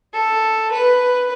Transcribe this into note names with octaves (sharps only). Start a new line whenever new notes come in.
A4
B4